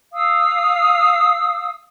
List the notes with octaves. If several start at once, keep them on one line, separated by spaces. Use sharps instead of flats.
F5 D#6 E6